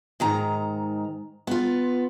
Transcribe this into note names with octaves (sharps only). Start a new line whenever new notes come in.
G#2 D#3 A#5
B3 F4